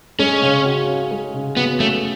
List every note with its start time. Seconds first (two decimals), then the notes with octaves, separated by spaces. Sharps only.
0.19 G#3 C#4
0.42 C#3
0.65 F#4
0.88 C#4
1.11 G#3
1.34 C#3
1.57 B3 F#4
1.80 A3 C#4